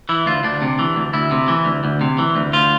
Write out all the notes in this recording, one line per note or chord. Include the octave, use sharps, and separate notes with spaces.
E3 E4
D2 F4
D2 D4
C3
E3
D2
D2 E4
C3
E3
D2
D2
C3
E3
D2
D2 F4